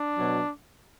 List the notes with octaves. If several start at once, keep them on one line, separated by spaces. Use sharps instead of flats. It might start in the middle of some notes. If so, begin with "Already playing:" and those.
Already playing: D4
B2 F#3